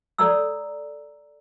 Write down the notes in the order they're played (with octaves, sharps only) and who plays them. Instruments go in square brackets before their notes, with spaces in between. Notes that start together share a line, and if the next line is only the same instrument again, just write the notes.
[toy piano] A4 C#5 D5 A#5 E6